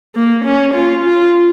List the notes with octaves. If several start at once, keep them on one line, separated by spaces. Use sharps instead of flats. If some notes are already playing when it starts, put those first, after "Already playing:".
A#3
C#4
F4
F4